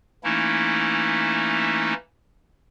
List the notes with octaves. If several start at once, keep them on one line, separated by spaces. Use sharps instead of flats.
E3 A3 A#3 C#4 D#4 E4